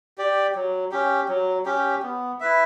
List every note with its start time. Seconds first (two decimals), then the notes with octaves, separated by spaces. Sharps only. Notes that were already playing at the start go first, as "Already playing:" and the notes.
0.18 G4 D5
0.55 F#3
0.92 C#4 G4
1.29 F#3
1.65 C#4 G4
2.03 B3
2.40 E4 B4 E5